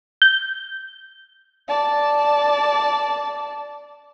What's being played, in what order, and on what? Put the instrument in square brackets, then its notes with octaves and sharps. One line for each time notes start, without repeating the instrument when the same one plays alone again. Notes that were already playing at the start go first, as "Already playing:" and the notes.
[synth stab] G6
[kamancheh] D5 A5